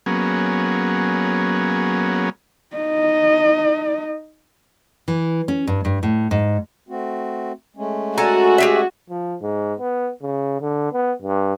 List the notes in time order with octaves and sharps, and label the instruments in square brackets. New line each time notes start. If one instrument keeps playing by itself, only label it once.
[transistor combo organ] F#3 A#3 B3 C#4 G#4
[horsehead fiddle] D#4 D#5
[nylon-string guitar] E3
C#4
G2
G2
A2
G#2
[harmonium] A3 C4 F#4
G#3 A3 C#4
[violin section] F#4 [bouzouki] A4 G#5 A#5
[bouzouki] G4 G#4 E5
[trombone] F3
G#2
B3
C#3
D3
B3
G2